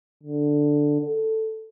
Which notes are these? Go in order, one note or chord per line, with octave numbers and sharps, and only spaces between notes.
D3
A4